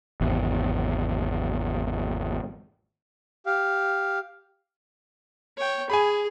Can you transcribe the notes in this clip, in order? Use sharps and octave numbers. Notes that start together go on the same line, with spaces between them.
G#1 E2
G4 F5
C#5 G5
G#4 G#5 B5